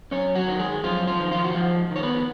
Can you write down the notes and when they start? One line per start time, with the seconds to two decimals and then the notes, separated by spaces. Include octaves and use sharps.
0.11 F#2 C#4 C#5
0.36 F#3 F#4
0.47 D#3
0.59 G#3 G#4
0.83 F#2 F3 F4
1.07 F3 F4
1.20 D#3
1.31 F3 F4
1.44 F#4
1.55 G#2 F3 F4
1.91 D#3 C#5
2.03 B3 B4